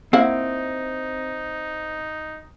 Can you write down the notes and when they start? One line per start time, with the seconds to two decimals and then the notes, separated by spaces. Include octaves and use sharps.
0.13 A#3 C4 D#4 E4 F#5